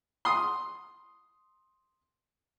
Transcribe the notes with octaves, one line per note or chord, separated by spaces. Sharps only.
C6 D#6